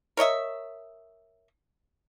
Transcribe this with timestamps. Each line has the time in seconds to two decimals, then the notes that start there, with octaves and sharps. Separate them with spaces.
0.17 A#4 C#5 D#5 E5